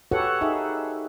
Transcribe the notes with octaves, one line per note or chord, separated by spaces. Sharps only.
F#4 G4 A4 B4 C#5 F#5
D#4 G#4 E5